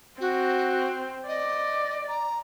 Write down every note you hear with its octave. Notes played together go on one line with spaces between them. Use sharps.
C4 F#4
D5 D#5
A#5